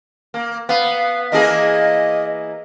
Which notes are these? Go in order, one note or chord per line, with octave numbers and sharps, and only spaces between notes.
A#3
B3 F5
E3 A#3 G#4 D#5